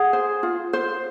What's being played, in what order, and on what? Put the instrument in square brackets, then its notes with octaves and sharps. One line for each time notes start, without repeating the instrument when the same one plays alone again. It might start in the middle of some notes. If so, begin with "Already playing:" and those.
Already playing: [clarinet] G#4 [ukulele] F#5
[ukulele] C5
F4
C5